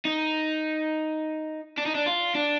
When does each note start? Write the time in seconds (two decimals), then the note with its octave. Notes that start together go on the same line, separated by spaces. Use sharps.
0.05 D#4
1.77 D4
1.86 D#4
1.95 D4
2.06 F4
2.35 D4